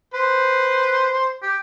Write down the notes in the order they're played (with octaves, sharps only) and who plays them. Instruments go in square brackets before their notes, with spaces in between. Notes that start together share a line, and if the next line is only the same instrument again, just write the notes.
[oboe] B4 [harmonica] C5
[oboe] G4